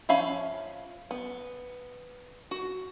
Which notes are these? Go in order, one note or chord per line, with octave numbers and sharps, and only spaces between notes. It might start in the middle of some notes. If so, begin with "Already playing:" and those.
F3 C#4 E5 F5 B5
B3
F#4